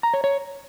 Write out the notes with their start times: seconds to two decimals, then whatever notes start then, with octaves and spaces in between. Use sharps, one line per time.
0.03 A#5
0.14 C#5
0.24 C#5